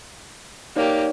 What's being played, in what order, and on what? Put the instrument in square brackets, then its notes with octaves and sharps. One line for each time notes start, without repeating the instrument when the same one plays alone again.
[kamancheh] A#3 G4 [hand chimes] D#4 C#5 D5